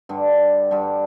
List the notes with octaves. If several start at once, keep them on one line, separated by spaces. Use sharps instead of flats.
G2 D3 G3
G2 D3 G3